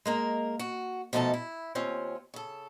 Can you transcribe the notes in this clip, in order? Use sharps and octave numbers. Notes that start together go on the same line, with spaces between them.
G#3 A#3 A#4
F#4
B2 F3 A3 D#4 A4 A5
E4
D#2 C4 C#4 F4
C#3 A4